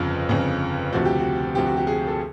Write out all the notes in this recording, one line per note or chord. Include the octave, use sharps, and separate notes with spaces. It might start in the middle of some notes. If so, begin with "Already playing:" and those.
Already playing: G1 F2 C#3 F4
G1 F2 C#3
D2 C3 F3 F#4
G4
F#4
D2 C3 F3 G4
F#4
G4
G#4
A4